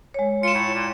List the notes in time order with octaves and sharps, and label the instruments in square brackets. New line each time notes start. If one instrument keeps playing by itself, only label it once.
[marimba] G#3 C#5
[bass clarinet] F4 [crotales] C#7 E7
[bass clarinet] A2
A#2